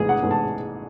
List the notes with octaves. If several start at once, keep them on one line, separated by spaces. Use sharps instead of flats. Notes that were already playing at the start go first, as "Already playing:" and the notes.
Already playing: A1 G#2 G#3 B3 G#4
F#5
A1 G#2 G#3 B3
A5